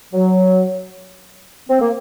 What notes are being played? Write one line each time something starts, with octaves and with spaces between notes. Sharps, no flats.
F#3
C4
A#3